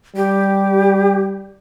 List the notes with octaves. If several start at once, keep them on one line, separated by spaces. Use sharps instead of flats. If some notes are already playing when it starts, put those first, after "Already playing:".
G3 G4